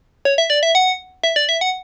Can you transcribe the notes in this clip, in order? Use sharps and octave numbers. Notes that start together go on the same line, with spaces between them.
C#5
E5
D5
E5
F#5
E5
D5
E5
F#5